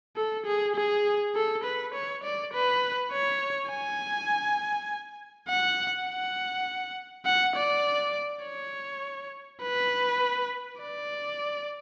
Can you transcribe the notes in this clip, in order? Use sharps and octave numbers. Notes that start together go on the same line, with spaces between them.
A4
G#4
G#4
A4
B4
C#5
D5
B4
C#5
G#5
F#5
F#5
F#5
D5
C#5
B4
D5